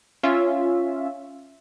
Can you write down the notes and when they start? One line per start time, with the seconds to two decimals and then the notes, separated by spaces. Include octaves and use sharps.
0.23 C#4 F4 E5